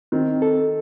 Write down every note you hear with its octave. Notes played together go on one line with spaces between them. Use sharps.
D#3 C4
A4